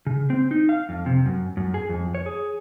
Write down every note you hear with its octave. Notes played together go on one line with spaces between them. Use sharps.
C#3
C4
D#4
F5
F2
C3
F#2
F#2
G#4
F2
C#5
G#4